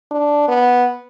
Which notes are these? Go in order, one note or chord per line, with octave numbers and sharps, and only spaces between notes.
D4
B3